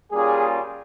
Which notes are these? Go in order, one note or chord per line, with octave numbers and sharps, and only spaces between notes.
G3 A#3 C#4 F4 G#4